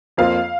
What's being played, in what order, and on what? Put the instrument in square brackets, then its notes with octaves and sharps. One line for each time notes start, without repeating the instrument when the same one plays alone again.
[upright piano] F2 F3 A#3 F4 C5 [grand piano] F5